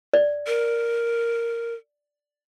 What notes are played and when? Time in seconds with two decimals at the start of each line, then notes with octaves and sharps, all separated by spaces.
0.14 D5
0.47 A#4